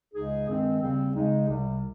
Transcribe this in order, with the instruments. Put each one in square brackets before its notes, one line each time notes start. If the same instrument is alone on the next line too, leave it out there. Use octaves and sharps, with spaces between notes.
[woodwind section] C#2 C#3 G#3 D#4 G#4
G2 D#3 G#3 C4
D#2 C#3 G3 C4
C#3 G#3 D#4
C2 C3 G3